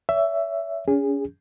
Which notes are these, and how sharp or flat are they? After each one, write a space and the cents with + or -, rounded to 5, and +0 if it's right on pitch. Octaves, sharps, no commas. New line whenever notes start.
C#5 +35 E5 +10
C#4 +30 G#4 -20